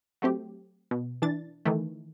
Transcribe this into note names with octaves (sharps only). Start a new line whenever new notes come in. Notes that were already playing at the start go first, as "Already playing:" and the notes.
F#3 A3 C4 G4
B2
E3 D4 A6
D#3 E3 A3